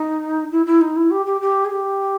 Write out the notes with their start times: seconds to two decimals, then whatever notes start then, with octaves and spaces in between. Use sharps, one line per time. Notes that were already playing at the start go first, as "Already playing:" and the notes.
Already playing: D#4
0.51 E4
0.66 E4
0.81 D#4
0.95 E4
1.10 G4
1.25 G4
1.40 G4
1.64 G#4
1.70 G4